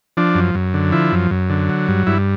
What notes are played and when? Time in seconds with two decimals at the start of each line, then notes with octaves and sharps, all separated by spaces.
0.17 F3 D4
0.35 F#2
0.55 F#2
0.74 D3
0.92 F3 E4
1.12 F#2
1.31 F#2
1.49 D3
1.69 F#3
1.88 G2
2.06 G2 E4